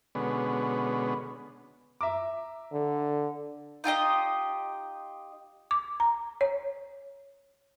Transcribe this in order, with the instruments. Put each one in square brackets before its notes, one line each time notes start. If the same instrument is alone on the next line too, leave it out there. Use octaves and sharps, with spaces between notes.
[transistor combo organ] B2 D3 G#3 B3 C#4
[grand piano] E5 A#5 D6
[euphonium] D3
[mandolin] D#4 F4 G4 D#5
[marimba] D6
A#5
C#5